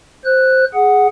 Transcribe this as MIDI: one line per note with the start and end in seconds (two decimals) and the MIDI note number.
0.25 0.65 72
0.25 0.65 90
0.74 1.07 68
0.74 1.07 78